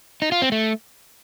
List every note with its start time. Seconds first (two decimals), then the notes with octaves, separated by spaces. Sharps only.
0.22 D#4
0.32 F4
0.42 C4
0.52 A3